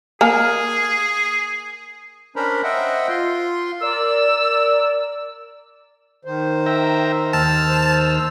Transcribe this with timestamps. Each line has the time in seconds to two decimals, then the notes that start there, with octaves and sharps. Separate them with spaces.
0.21 A#3 G#4 G#5
2.36 C#4 D4 A#4 C5 A#5 B5
2.64 C5 D#5 E5 F#5 G5
3.09 F4 C6
3.81 A#4 D5 E6
6.25 D#3 C5
6.66 E5 G5 A#5
7.33 D#2 A5 E6 F6
7.68 C5